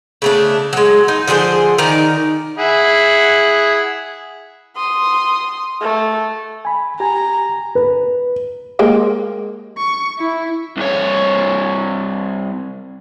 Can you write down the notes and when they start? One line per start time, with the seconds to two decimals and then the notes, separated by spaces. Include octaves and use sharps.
0.22 C#3 A3 D4
0.73 F#3 G#3
1.08 D#4
1.28 D3 F3 G#4 C5
1.78 D#3 D#4 A#4 D5
2.58 E4 G#4 F#5
4.76 C6 D#6
5.81 A3
6.65 G#5 B5
7.00 G4 G#5 A#5
7.75 B4
8.79 G#3 A#3 G4
9.77 C#6
10.19 E4
10.77 C2 C#5